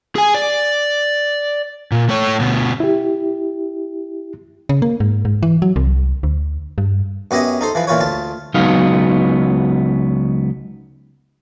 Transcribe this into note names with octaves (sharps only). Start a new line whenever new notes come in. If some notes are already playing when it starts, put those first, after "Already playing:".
G#4 G#5
D5
A#2
A3 C#5
D2 B2
E4 G4
C#3
A#3
G#2
G#2
E3
F#3
C2
D2
G2
F#2 B3 G4 D#5 E5 G#5
D#4 A4 C5
E3 F3 B4
A#2 E3 F4 B4 C#5
D2 F4 A5
C#2 F#3 B3 D#4 F5